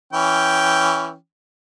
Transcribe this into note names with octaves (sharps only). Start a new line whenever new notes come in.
E3 C#4 G5